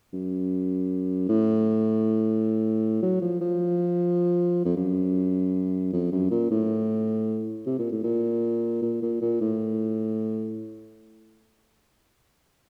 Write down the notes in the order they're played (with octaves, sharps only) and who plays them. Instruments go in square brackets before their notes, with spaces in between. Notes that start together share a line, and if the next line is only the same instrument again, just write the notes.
[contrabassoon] F#2
A2
F#3
F3
F3
F2
F#2
F2
F#2
A#2
A2
C3
A#2
A2
A#2
A#2
A#2
A#2
A2